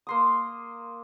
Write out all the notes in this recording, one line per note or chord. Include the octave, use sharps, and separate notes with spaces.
A#3 C6 D#6